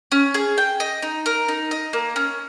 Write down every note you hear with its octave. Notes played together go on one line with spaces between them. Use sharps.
C#4
G#4
G5
D#5
D#4
A#4
D#4
D#5
A#3
C#4